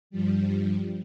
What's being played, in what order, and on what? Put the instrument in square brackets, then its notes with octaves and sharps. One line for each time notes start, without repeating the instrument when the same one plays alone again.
[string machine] G2 F3 G3